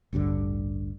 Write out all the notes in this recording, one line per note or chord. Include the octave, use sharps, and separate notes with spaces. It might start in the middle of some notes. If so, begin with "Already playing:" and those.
A1 D2 G2 D3